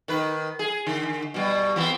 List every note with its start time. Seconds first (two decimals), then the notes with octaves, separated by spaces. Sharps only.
0.08 D#3 B4
0.59 G#4
0.87 D3
1.34 B2 G3
1.76 E2 B3 C4